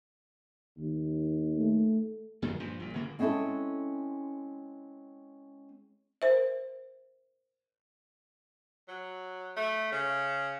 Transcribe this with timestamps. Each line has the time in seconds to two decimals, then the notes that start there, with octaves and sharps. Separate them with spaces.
0.77 D#2
1.57 A3
2.42 F#2 A#2 D#3 F3
2.60 G2 A#2 F3
2.80 A#1 A#2
2.94 G1 C#3 A#3
3.19 G#3 C4 C#4 E4 A4
6.22 A#4 C5 E5
8.88 F#3
9.56 A3
9.92 C#3